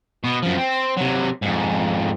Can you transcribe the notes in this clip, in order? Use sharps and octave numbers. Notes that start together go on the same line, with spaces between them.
B2 B3
F#2 F3
C4
C3 F#3
F2 G#2